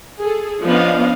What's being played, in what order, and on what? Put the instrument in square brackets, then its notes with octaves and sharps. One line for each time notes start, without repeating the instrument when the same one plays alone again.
[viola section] G#4 A4
F3 B3 C#4 D4 D#5 F5